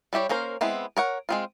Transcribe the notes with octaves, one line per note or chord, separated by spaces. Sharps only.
G3 E4 G4 C#5
A#3 C#4 A#4 C5
G#3 B3 C4 E4
A#4 C#5 F#5
G#3 C4 F4